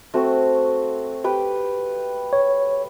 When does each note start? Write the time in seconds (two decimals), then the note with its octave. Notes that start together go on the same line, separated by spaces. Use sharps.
0.14 A3 C4 F#4
1.24 G4 B4 G5
2.33 C#5